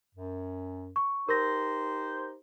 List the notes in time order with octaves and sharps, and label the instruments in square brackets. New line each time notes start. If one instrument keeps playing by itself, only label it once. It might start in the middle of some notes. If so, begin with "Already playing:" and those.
[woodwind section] F#2
[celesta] C#6
[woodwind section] D#4 G4 C5 [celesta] A#4 A#6